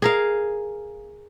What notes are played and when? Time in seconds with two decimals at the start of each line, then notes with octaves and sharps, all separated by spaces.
0.02 G#4 A#4 F5